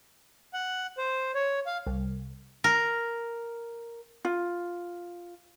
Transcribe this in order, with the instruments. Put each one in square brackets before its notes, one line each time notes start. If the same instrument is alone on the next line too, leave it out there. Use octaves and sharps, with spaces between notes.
[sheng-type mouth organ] F#5
C5
C#5
F5
[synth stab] C2
[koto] A#4
[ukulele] F4